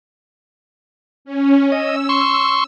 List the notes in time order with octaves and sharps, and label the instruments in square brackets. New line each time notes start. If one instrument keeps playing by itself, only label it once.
[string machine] C#4
[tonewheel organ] D#5 [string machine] E6
[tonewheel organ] C6 C#6